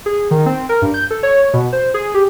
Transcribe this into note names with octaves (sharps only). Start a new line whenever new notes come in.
G#4
D#3
C4
A#4
G2
G6
A4
C#5
B2
C5
G#4
G4